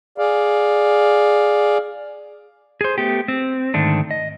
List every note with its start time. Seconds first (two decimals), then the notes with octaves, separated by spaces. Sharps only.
0.18 G#4 D5 F5
2.81 G#4 C5
2.98 A3 B3 G4
3.28 C4
3.74 G#2 D3 D#3 A3 D4
4.11 D#5